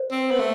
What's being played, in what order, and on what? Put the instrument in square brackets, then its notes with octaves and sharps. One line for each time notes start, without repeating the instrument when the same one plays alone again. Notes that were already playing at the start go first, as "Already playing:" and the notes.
Already playing: [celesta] C5
[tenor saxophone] C4
B3
A3